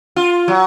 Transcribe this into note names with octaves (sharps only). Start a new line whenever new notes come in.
F4
F#3